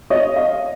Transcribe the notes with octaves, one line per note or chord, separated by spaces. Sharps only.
C#5 D#5
D#5 F5